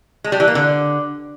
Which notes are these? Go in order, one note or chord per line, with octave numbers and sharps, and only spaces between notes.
G#3
G3
E3
A#3
D3